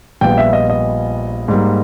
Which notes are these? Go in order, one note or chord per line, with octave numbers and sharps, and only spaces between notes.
A#1 A#2 G3 B3 G5
E5
D#5
D#5
G#2 G3 A#3